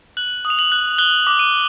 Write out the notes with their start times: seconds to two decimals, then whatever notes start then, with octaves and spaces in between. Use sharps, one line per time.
0.17 F#6 F#7
0.45 D#6
0.50 F7
0.59 F#7
0.72 F#6
0.99 F#6 G7
1.27 D6
1.39 D#7